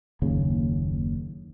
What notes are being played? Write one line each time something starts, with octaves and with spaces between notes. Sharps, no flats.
F#1 D#2 C#3